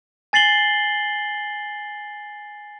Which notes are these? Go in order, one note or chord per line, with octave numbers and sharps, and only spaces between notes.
G#5 A6 C7 F#7 G7